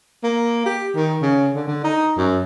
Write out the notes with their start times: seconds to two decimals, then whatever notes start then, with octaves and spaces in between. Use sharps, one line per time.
0.24 A#3
0.66 G4
0.96 D#3
1.22 C#3
1.55 D3
1.68 D3
1.84 D#4
2.18 F#2